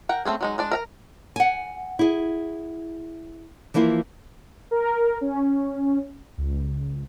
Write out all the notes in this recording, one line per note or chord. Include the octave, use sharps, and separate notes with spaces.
A#4 F#5 G5
A3 C4 C#4 G#4
F#3 G#3 D#4
G#3 D4 D5
A#4 E5 A#5
F#5 G#5
E4 G#4
E3 F3 A#3 E4 F4
A#4
C#4
C#2